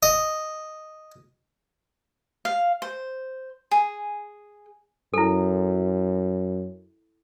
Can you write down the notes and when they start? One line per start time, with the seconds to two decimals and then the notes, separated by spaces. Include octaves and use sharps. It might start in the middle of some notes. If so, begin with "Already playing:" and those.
0.03 D#5
2.45 F5
2.82 C5
3.71 G#4
5.14 F#2 E4 A4